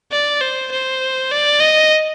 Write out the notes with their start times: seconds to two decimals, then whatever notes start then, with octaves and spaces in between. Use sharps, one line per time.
0.12 D5
0.41 C5
0.72 C5
1.31 D5
1.60 D#5